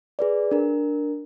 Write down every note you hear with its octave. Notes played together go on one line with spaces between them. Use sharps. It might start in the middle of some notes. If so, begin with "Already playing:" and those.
G#4 B4 D5
D4 A#4